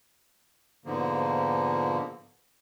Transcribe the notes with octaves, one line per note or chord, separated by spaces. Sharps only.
G#2 B2 D3 F3 A#3